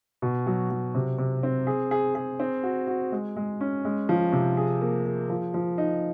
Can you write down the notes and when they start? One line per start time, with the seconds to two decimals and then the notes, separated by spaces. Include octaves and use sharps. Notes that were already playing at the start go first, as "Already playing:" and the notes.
0.22 B2
0.47 F#3
0.70 F#3
0.95 C3
1.19 C3
1.43 C4
1.67 G#4
1.91 G#4
2.15 G#4
2.40 C4
2.63 F#4
2.87 F#4
3.12 G#3
3.36 G#3
3.61 C#4
3.85 G#3
4.09 F3
4.33 C3
4.57 G#4
4.81 A#3
5.05 G#4
5.29 F3
5.54 F3
5.78 D#4